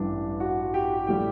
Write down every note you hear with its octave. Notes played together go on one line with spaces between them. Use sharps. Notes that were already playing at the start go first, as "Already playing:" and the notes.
Already playing: A1 G2 E3 G3 D4
F#4
G4
A2 G3 G4